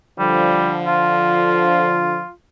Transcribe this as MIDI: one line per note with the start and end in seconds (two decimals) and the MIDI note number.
0.19 2.23 50
0.19 2.23 53
0.19 0.75 55
0.87 2.31 65